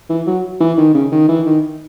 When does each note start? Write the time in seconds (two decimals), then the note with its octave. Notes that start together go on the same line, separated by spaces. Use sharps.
0.10 E3
0.27 F#3
0.60 E3
0.77 D#3
0.94 C#3
1.12 D#3
1.28 E3
1.46 D#3